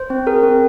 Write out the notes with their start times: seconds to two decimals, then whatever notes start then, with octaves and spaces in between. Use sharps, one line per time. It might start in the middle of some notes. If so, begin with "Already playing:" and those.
Already playing: C5
0.10 C4
0.27 G#4 A#4
0.43 C4